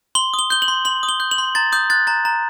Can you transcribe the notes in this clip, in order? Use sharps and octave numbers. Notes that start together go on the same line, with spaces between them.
C6 G7
D#6
G7
G6 G7
F#7
C6
C6 F#7
D#6
G7
G6
F#7
C6
A#5 A6
D#6 G6
F#6 A6
A#5 A6
A#5